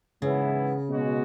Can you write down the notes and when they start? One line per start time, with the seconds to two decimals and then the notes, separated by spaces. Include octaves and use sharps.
0.22 G#2 C#3 E3 B3 E4
0.88 B2 G#3 C#4 F#4